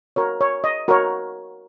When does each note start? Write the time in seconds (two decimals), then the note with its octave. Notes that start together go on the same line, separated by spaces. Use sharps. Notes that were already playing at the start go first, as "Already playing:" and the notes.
0.16 F#4 A#4 C#5
0.41 C#5
0.64 D#5
0.88 F#4 A#4 C#5